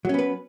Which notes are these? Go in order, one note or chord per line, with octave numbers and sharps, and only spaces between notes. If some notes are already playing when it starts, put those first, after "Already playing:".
F#3 B3 C#4 B4